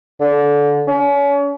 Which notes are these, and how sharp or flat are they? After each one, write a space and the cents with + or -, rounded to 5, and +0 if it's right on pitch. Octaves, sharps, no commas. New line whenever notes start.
D3 -20
C#4 +35